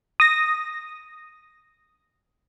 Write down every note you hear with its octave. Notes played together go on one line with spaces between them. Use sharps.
D#6 A#6